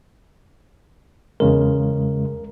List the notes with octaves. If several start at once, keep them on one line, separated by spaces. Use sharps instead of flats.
E2 C#3 G#3 A#4